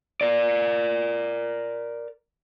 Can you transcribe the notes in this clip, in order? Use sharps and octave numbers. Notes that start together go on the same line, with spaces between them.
A#4 D5